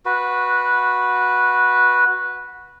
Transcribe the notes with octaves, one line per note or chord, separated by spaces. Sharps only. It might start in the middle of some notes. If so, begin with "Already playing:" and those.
F#4 B4